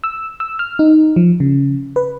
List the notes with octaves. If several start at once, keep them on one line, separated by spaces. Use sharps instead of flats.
E6
E6
F6
D#4
F3
C#3
B4